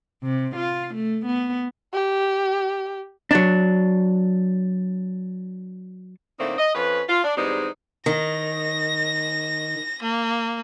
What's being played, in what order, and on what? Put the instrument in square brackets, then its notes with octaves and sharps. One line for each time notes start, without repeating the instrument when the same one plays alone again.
[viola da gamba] C3
F4
A3
B3
[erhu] G4
[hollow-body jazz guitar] F#3 D4
[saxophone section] A2 D3 A3 A#3 C4 D#4
D#5
F2 F3 C#4 B4
F4
D4
E2 G#2 G3 G#3 C4 D#4
[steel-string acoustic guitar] D#3 [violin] A#6
[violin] A#3